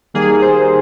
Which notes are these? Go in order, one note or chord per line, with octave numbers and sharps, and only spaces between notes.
D#3 G3 A#3 G#4
C5